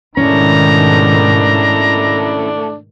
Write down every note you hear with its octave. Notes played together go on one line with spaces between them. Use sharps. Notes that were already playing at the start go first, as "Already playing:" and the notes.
G#2 B2 D#3 A3 C#4 D4 E4 A#5